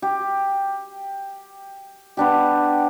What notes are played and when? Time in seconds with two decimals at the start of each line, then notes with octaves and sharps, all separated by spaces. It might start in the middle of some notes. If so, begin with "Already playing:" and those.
0.02 G4
2.17 B3 D4 G4